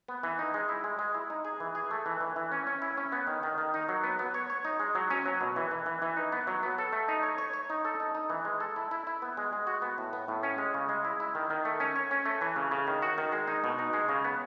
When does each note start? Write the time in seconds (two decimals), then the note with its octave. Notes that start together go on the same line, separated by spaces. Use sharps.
0.08 B3
0.23 E3
0.39 D#4
0.54 G#3
0.69 E4
0.84 G#3
0.99 G#3
1.14 E4
1.30 D#4
1.45 G#4
1.60 E3
1.75 G#4
1.91 A3
2.06 E3
2.21 E3
2.36 E3
2.52 C#4
2.67 C#4
2.82 E4
2.97 C#4
3.12 B3
3.27 D#3
3.43 D#3
3.58 D#3
3.74 D#4
3.89 F#3
4.04 B3
4.19 B3
4.34 C#5
4.50 C#5
4.65 D#4
4.80 G#3
4.95 F#3
5.10 C#4
5.26 F#3
5.41 B2
5.56 E3
5.71 E3
5.86 E3
6.02 E3
6.17 D#4
6.32 B3
6.47 F#3
6.63 B3
6.78 A4
6.93 A3
7.08 D#4
7.23 C#5
7.38 C#5
7.53 C#5
7.70 D#4
7.85 A4
8.00 D#4
8.15 D#4
8.30 E3
8.45 G#3
8.60 A4
8.76 E4
8.91 E4
9.07 E4
9.22 B3
9.37 G#3
9.53 G#3
9.67 F#4
9.82 B3
9.98 A2
10.13 B3
10.28 A2
10.43 C#4
10.58 G#3
10.74 C#3
10.89 G#3
11.05 E4
11.20 E4
11.35 D#3
11.50 D#3
11.65 A3
11.80 C#4
11.96 C#5
12.11 C#4
12.26 A3
12.41 E3
12.56 C#3
12.71 C#3
12.87 D#3
13.02 F#4
13.18 D#3
13.32 G#3
13.48 D#4
13.64 B2
13.79 D#4
13.93 G#3
14.09 C#3
14.24 B3